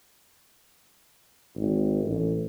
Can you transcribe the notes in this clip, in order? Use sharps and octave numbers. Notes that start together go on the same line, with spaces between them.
G#1
A1